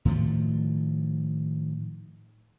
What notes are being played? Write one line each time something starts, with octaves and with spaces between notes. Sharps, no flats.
A2 D#3 F3 F#3